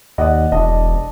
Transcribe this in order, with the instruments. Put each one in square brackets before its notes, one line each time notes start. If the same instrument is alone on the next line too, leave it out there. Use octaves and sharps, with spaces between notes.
[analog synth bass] D#2 [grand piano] D5 D#5 F#5
[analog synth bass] E1 [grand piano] D4 D#5